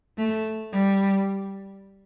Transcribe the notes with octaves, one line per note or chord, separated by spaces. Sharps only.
A3
G3